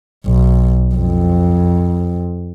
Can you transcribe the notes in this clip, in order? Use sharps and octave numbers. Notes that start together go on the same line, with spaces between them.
B1
F2